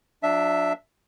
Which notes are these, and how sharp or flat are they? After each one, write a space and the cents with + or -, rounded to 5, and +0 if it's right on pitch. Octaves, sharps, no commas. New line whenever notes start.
F#3 -40 D4 +0 E5 +0